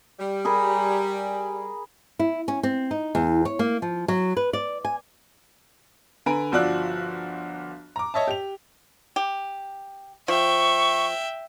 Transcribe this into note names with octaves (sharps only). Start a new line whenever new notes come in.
G3
G#4 A#4 B5
E4
C#4
C4
D#4
E2
C#5
A#3
F3
F#3
B4
D5
G#5
D3 B4 G#5 A#5 B5 D7
G1 F3 F#4 D5 E6 F#6
A#5 D6
C#5 D#5 E5 A5
G4 F7
G4
F3 E5 G5 C#6